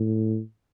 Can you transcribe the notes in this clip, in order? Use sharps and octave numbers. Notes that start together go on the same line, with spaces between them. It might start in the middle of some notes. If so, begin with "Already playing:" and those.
Already playing: A2